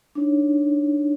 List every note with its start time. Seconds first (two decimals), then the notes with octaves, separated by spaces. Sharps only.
0.15 D4 D#4 C#5